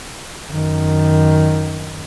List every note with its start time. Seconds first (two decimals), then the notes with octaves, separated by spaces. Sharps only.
0.49 F#2 D#3